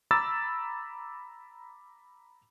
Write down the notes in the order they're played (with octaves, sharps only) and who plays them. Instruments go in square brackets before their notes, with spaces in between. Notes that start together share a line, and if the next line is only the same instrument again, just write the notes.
[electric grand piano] A#5 B5 D6 E6 A6